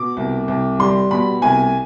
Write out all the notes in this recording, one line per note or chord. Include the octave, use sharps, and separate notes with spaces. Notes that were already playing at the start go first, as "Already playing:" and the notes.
Already playing: B2 D6
C2
C2
G3 C6
B2 B5
C2 G#5